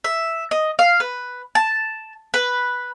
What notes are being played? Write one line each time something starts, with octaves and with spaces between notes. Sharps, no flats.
E5
D#5
F5
B4
A5
B4